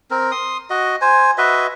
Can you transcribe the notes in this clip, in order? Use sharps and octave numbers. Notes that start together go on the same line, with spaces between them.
C4 A#4
C6 D#6
F#4 D#5
C5 G#5
F#4 B4 D#5 E5